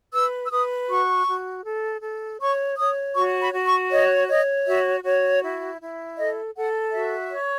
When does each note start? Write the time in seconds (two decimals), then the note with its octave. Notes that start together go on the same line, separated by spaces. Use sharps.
0.14 B4 E6
0.45 E6
0.51 B4 D#6
0.89 F#4 C#6
1.27 F#4
1.65 A4
2.02 A4
2.40 C#5 C#6
2.78 C#5 D#6
3.15 F#4 C#6
3.41 B5
3.53 F#4
3.67 C#6
3.91 C#5 D#5
4.28 C#5 D#5
4.67 F#4 E5
5.04 F#4 C#5
5.43 E4
5.80 E4
6.17 A4 D#5
6.55 A4 F#5
6.93 F#4 E5
7.31 C#5